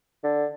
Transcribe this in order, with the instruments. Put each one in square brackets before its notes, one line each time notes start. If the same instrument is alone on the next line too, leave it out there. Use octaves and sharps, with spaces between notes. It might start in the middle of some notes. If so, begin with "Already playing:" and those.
[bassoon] D3